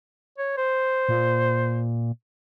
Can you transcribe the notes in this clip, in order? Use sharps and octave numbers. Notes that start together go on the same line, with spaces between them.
C#5
C5
A#2